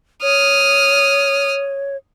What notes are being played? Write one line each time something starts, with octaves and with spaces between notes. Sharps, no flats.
C#5 D#6 F6